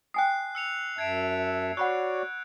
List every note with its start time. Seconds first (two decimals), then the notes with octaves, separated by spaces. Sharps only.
0.14 G5 G#5 D#6 F#6 C7
0.55 E6 C#7 F7
0.98 F#2 E5 A5 G#6 C7 D7
1.77 F#4 C#5 D5 F#5 B5 C#6 F#6